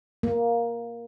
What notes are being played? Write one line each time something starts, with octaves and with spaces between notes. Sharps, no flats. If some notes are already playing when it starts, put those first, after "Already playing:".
A#3